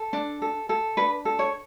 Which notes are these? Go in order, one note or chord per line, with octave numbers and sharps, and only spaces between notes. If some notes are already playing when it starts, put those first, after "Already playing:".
Already playing: A4
D4
A4
A4
D4 B4
A4
C#5